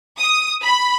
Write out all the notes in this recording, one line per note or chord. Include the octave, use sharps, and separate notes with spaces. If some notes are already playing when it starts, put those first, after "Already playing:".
D#6
B5